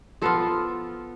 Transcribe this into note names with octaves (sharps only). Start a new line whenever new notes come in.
F3 B3 F4 A4